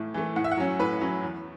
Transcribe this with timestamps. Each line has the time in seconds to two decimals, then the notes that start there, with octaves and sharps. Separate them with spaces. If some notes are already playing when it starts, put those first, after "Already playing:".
Already playing: A2 E3 A3
0.14 E3 A3
0.36 A2 F#5
0.44 E5
0.51 F#5
0.57 F#3 C#4
0.79 A2 B4
1.01 F#3 C#4
1.23 E2